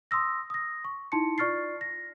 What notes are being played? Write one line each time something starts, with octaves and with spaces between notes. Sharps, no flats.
C6 D#6 E6 A#6
D#6 A#6
C#6
D#4 E4 A5 C6 C#7
F4 D5 C#6 F6 A6 C7
A#6